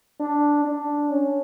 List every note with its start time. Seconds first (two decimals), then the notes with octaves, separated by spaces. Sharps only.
0.20 D4
0.65 D4
1.10 C#4